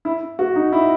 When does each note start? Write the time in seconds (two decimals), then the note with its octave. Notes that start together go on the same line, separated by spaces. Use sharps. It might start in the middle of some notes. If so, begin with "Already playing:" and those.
0.05 E4
0.39 F#4
0.55 D#4
0.72 E4